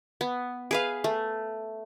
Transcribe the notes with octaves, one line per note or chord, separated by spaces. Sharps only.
B3
G#4 B4 F5
A3